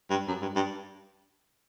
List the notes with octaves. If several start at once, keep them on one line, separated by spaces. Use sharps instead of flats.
G2
F#2
G2
G2